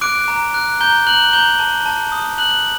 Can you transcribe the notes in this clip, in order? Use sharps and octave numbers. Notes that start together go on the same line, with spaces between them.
D6 F#6 D7
A#5
F#6
A#5 G6 G7
A#5 F#6 F#7
A#5 G6 G7
A5
A5
D#6
F#6 F#7